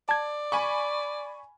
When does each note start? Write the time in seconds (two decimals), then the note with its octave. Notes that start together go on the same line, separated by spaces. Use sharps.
0.09 D5 A5 G#6
0.52 G#5 B5 C#6